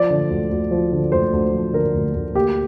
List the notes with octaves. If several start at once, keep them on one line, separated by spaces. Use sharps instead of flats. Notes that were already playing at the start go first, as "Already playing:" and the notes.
Already playing: F3 D5
D3
D2
D2
F3
D3
D2 C5
D2
F3
D3 A#4
D2
D2
A#3 G4